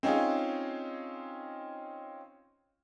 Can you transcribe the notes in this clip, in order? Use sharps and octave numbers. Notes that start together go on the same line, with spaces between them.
C4 C#4 D#4 F4 G#4